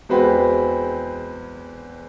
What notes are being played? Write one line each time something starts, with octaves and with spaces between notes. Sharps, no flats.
E2 G#3 C4 F#4 B4 G5